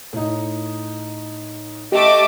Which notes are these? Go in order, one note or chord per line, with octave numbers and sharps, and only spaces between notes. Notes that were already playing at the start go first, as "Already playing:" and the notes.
A2 D#4
A3 G4 D#5 D6